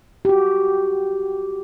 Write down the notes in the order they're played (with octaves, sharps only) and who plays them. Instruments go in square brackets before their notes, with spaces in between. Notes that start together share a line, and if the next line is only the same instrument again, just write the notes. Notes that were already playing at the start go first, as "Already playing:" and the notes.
[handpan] F#4 G4